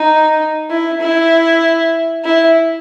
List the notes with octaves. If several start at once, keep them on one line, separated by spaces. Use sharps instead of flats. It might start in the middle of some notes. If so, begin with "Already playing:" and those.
Already playing: D#4
E4
E4
E4